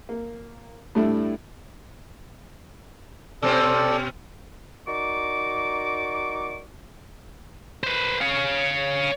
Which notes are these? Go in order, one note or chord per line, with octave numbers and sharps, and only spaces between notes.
A#3
A2 G3 A3 D4 E4
B2 C4 C#4 A4 D5
D#4 F#4 A#4 D5 C#6 D6
B4 C5
C#5 F5